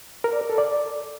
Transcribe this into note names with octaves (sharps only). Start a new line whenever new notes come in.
A#4
D5
A#4
A4
D5